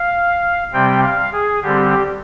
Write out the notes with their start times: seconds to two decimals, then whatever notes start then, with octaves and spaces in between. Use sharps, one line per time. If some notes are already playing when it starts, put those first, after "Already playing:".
Already playing: F5
0.73 C3 G3 C4 G5
1.03 F5
1.33 G#4
1.63 D3 G3 C4 G4